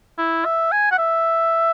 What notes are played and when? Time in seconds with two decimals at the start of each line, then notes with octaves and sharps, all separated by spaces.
0.18 E4
0.45 E5
0.72 G#5
0.91 F#5
0.99 E5